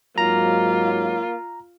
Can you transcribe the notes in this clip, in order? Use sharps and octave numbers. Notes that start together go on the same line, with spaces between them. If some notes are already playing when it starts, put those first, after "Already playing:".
G#2 F#3 A#3 F4 A#5